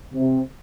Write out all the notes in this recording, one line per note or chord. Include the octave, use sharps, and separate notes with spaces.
C3